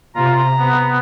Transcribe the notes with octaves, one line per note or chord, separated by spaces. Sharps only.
C3 F4 A#5
B3